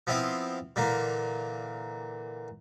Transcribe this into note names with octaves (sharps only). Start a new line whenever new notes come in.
F3 B3 C4 E4 F4
A#2 D3 E3 A#3